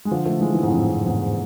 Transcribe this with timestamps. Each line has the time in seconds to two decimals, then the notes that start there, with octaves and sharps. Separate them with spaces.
0.05 G#3
0.11 D3 F3
0.25 F3 A3
0.40 E3 G#3
0.54 E3 G#3
0.63 G#2
0.68 F2 A2
0.87 F2
1.06 E2 G#2